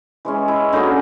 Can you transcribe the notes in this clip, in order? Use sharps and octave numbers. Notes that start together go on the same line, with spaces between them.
E3 G#3 C#4
E4
D3 F#3 A#3 C#4 D#4